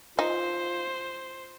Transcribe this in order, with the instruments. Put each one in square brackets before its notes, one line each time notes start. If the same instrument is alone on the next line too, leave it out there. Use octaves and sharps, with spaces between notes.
[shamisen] D#4 [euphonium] F4 [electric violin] C5